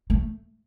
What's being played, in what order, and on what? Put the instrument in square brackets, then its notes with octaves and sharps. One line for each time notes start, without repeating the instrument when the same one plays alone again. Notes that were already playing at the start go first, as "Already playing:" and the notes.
[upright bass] A3